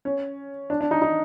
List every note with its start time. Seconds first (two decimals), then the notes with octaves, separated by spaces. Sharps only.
0.05 C#4
0.70 D4
0.81 D4
0.91 D#4
1.02 D#4